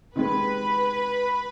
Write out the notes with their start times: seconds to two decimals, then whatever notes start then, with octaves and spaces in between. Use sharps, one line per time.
0.15 C3 D#3 G#3 B4